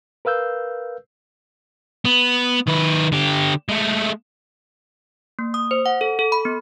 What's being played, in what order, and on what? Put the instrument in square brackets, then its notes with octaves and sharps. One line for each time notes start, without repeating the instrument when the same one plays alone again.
[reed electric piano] A#4 B4 F5 E6 G6
[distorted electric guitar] B3
D#3 B4
D3 G4
G#3 A3
[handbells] A#3
D#6
C5
F#5
A4
A4
B5
B3